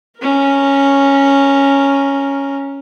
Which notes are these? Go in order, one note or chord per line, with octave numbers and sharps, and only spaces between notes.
C#4 A#4